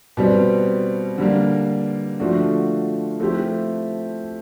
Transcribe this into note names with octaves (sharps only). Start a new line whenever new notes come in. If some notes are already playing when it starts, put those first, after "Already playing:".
B2 G3 C4
D3 G3 A#3
D3 F3 A3 D4 F#4
F3 A3 C4 E4 G4